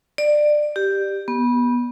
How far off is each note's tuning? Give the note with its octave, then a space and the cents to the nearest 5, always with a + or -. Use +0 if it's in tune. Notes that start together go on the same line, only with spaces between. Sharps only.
D5 +20
G4 +0
B3 -20